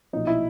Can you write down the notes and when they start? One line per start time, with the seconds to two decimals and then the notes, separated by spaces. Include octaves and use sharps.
0.13 B1 A#2 F3 D#4
0.27 E4